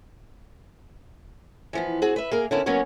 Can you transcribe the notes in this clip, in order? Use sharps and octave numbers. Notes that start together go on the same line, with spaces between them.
E3 F3 B3
C4 F#4 G#4
B4 E5
A#3 G#4 A#4
D3 A#3 B3 C#4 E4
F#3 A#3 B3 C#4 C#5